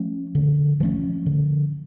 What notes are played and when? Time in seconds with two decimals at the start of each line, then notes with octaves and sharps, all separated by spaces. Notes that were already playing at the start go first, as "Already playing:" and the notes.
Already playing: F3 A3 C#4
0.35 D3
0.80 F3 A3 C#4
1.26 D3